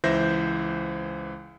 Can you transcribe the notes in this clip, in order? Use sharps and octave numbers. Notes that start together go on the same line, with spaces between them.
C#2 E3 C5 E5 G6 A#6